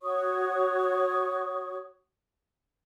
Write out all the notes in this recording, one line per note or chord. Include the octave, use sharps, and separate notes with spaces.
F#4 C#5 C#6 D#6